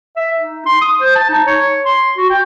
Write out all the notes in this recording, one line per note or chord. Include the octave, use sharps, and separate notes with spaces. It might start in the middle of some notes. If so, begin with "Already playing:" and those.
E5
D#4
C6
D#6
C5
A5
D#4
C#5
C6
F#4
G5